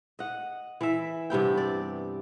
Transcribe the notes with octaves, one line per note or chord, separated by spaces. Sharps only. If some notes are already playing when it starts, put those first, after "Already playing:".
D#5 F#5
E3 E5
G2 C3 B3 G5
D5